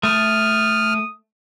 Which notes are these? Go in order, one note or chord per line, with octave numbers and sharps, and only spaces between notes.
A3 D#6 F6